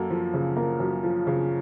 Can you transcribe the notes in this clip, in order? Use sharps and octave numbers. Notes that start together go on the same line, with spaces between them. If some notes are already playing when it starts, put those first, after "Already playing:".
Already playing: F#2 A#3 A4
F3
C#3
A#3 A#4
F#2
F3
C#3